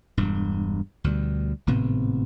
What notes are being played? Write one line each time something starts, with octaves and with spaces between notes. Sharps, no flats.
E1 G2
D2 B2 F#3 G3
G#1 A2 C3 B3